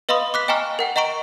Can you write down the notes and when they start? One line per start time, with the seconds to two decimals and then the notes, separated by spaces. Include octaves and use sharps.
0.09 B4 D#5 F5 B5 C6 D#6
0.34 D6 F#6 B6
0.48 D#5 G5 G#5 A#5 C#6 F6
0.79 A#4 F#5 G5
0.96 D#5 F#5 A#5 C#6 D7